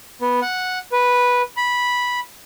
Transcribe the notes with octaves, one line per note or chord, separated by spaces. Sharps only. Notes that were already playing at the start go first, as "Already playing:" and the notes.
B3
F#5
B4
B5